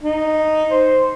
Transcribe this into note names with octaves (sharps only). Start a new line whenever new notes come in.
D#4
C5